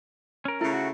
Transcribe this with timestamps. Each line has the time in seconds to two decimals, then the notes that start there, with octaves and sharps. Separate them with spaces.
0.45 C#4 A#4
0.61 C#3 A3 E4
0.73 F#4